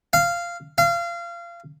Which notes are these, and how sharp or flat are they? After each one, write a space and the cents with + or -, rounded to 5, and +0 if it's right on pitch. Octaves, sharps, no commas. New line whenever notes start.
F5 -15
F5 -30